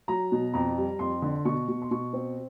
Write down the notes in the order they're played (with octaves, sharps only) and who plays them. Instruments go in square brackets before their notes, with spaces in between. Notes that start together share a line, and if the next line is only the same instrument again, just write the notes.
[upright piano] F#3 A#5
B2
F2 A#5
G3
F2 C6
D3
C6
B2 C#6
B2
C6
B2 C#6
C4